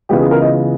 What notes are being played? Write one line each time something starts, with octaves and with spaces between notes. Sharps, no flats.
C#2 C#3 E3 G#3 B3 G4
G#4
A#4
D#5